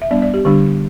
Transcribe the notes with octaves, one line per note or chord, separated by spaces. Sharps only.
E5
G3 B3 D4 D5
D5
G4
D3 G3 D4 G4